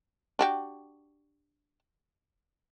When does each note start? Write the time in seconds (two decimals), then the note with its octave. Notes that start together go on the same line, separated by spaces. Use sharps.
0.39 D4 F#4 G4